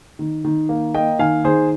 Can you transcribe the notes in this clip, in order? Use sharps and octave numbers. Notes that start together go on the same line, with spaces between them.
D#3
D#3
A#3
A#3 D#5 G5
D#3 F5 G#5
D#3 G#4 C5